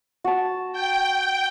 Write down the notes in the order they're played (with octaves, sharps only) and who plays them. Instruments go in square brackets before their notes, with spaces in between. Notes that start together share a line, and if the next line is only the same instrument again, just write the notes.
[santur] F#4 A5
[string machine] G5